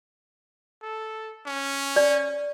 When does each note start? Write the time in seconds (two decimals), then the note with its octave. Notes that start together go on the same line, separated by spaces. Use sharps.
0.82 A4
1.46 C#4
1.96 D5